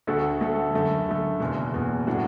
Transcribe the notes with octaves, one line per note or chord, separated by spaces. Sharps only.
D2 D3 A3 F#4 A4
D2 D3 A3 F#4 A4
F#2 D3 A3
F#2 D3 A3
F#1 E2 B2
F#1 E2 B2
A2 F#3 D4 F#4